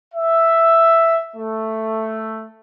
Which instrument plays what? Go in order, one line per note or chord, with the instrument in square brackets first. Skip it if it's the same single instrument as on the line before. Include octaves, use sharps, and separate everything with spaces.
[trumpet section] E5
A3